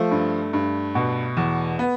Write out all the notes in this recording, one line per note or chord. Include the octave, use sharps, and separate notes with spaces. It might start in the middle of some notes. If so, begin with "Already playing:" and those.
Already playing: F3 A3
G2
G2
B2
E2
B3